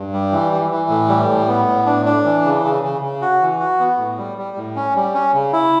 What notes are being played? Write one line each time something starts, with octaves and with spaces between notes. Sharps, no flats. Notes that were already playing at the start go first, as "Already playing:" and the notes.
Already playing: G2
G3
E3
E3
E3
A2
G3
A2
B3
A2
D4
D4
E3
C#3
C#3
C#3
C#3
F#4
E3
F#4
B3
A2
G3
G3
A2
C#4
G3
C#4
C#3
E4